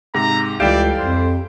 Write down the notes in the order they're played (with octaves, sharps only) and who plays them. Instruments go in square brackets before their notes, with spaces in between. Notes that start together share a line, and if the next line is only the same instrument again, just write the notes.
[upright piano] G#2 C3 [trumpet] A#5
[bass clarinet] C#2 [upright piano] E3 G3 F5 [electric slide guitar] G4 A4 G5 [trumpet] D5
[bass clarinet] F2 [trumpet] C5